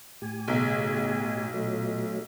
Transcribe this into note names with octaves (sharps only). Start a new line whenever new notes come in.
A2 G4 G#5
B1 C#3
A#2 F#3 A3